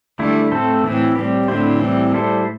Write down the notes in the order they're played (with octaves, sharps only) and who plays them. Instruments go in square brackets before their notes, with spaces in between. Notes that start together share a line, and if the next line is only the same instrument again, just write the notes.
[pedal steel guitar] D3 A3 E4 [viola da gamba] G3
[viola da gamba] A2 [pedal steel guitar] A3 C4 A4 C5
[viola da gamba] A2 [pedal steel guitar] E3 C4 E4
[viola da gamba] A2 [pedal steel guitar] G3 C4 G4
[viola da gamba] A2 [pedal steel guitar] D3 C4 E4 C5
[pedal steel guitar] E3 G3 C4
G3 E4 A4 C5